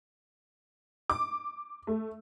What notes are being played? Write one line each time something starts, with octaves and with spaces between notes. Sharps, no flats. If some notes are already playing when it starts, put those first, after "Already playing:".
D6
A3